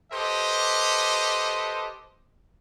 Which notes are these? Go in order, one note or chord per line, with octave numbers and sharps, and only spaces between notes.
G4 A4 B4 C5 D#5